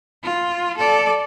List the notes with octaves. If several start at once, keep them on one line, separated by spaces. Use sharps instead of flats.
F4
A4 D5